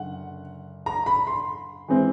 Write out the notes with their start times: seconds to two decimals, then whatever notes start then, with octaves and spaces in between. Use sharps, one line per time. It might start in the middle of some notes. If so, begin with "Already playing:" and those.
Already playing: F#1 D3 F#5
0.86 A#5
1.06 B5
1.27 C6
1.88 E3 G#3 C4